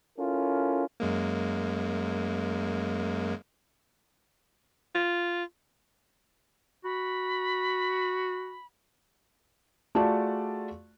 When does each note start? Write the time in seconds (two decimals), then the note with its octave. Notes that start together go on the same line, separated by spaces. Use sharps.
0.18 C#4 E4 F4 A4 A#4
1.00 F#2 G#3 A#3
4.95 F4
6.84 F#4 B5
9.95 A3 F4 F#4 G#4 D5 A5